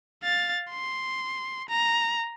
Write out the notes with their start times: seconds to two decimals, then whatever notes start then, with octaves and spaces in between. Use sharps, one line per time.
0.23 F5 A6
0.71 C6
1.69 A#5